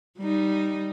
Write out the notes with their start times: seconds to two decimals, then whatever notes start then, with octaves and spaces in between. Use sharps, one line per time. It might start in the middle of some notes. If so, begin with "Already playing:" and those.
0.19 G3 D#4